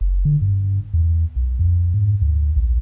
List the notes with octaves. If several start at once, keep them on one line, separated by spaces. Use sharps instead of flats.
F#1
D3
G2
E2
B1
F2
G#2
D2
A#1